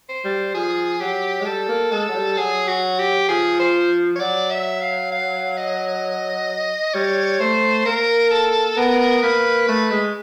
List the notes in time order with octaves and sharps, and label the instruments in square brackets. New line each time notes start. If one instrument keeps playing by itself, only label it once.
[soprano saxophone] C5
[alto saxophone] G3
[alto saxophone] F3 [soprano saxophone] G#4
[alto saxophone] F#3 [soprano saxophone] G4
[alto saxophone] G#3
[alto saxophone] G3 [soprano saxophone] A4
[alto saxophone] A#3
[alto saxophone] G#3 [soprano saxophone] A4
[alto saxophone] F#3
G3
[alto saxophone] F#3 [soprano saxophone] G#4
[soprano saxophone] F#4
G4
[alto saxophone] F3 [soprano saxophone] G#4
[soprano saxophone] C5
C#5
[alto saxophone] F#3 [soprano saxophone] D5
[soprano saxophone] E5
F5
F5
D#5
[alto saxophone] G3 [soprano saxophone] C#5
[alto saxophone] A3 [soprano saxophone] C5
[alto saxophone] A#3 [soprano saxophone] A#4
[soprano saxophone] A4
[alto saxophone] B3 [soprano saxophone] A#4
[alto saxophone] A#3 [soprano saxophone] B4
[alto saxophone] A3 [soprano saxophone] B4
[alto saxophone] G#3